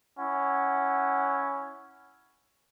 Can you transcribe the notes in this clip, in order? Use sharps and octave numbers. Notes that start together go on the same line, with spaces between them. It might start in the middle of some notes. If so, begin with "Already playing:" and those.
C#4 E4 F#5